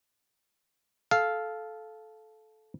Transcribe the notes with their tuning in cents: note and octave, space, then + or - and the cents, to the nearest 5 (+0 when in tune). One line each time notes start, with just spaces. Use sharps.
A4 -15 F5 +0